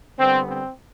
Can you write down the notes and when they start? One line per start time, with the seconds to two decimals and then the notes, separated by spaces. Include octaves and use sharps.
0.18 D3 G3 B3 C4
0.49 C4